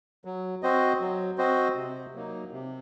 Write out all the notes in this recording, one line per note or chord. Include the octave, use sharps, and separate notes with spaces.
F#3
C4 F#4 C5 D#5
F#3
C4 F#4 C5 D#5
C3
F#3 A#3 D#4
C3